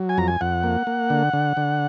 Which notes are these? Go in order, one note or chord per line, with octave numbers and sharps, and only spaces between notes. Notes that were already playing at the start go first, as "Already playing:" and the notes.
Already playing: F#3
G#5
F2 A#5
G#5
F2 F#5
A#3
A#3
D3
D3
D3